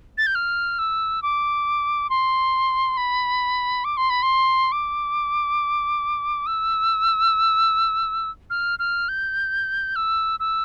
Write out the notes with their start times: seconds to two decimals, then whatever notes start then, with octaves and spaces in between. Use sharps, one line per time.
0.18 A6
0.26 G6
0.35 F6
0.79 E6
1.22 D6
2.10 C6
2.97 B5
3.84 D6
3.97 C6
4.10 B5
4.22 C6
4.72 D6
6.46 E6
8.50 F6
8.79 F6
9.08 G6
9.96 E6
10.40 E6